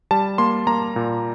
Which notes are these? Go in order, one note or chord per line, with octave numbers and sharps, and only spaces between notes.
G3 A5
A#3 C6
A#3 A#5
A#2